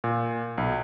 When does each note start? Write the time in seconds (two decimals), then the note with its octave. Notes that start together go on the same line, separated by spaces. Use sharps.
0.04 A#2
0.58 B1